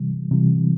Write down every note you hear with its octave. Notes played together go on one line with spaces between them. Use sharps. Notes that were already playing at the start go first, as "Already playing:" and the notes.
Already playing: C3 E3 G3
C3 E3 G3